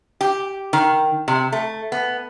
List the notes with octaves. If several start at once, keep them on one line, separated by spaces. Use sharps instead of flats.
G4
D#3
C3
A3
B3